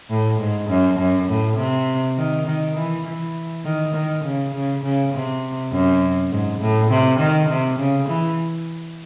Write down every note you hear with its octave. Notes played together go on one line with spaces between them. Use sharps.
A2
G#2
F#2
F#2
A2
C3
D#3
D#3
E3
E3
D#3
D#3
C#3
C#3
C#3
C3
F#2
G#2
A2
C3
D#3
C3
C#3
E3